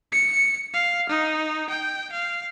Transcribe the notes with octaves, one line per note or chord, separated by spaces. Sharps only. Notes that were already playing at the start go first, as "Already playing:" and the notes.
C#7
F5
D#4
G5
F5